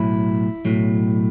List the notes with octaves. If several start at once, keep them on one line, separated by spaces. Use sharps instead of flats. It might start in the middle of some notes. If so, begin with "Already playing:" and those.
Already playing: B1 A2 F#3 E4
B1 A2 F#3